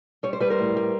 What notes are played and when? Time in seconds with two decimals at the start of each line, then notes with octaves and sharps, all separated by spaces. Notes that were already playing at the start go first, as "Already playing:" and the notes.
0.23 G3 C#5
0.33 C5
0.40 G3 B4
0.50 A#4 C5
0.58 A2
0.77 G3